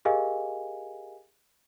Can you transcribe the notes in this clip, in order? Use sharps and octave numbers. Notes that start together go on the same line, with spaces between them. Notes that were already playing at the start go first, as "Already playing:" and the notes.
G4 G#4 A#4 D#5 F5 G#5